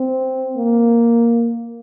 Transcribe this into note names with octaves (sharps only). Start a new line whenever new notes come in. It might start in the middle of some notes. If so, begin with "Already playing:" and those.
Already playing: C4
A#3